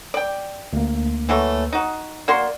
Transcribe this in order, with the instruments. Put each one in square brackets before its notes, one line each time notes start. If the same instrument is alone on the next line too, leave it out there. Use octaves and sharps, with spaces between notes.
[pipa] D5 G5
[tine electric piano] D2 A#3
[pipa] E3 F#3 A3
D#4 F#4
[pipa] A#3 F#4 C6 [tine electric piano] D5